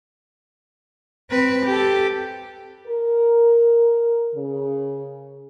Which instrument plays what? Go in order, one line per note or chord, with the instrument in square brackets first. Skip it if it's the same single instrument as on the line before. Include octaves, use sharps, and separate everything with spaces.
[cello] C4 B4
G4 A4
[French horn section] A#4
C#3